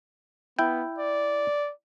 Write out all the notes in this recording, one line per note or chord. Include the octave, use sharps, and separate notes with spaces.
B3 E4 G5
D5